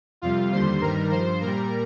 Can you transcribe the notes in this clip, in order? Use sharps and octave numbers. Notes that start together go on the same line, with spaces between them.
F2 C3 G3 F4 F5
D#2 D3 G3 C5 C6
G2 D#3 G3 A#4 A#5
G2 F3 C5 C6
A#2 G3 A#4 A#5